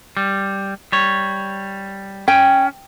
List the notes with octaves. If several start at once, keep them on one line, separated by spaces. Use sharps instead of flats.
G3
G3 C#5
C#4 G5